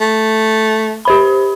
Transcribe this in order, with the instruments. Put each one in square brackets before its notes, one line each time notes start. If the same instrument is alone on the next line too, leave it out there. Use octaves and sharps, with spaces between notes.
[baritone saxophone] A3
[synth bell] G4 C5 B5